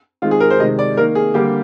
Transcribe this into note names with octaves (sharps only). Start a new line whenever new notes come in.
D#3 G#3 C4 F4
G#4
A#4
C5
C3 D#3 G#3 D#5
D5
D#3 A#3 A#4
G#4
D3 G3 A#3 G4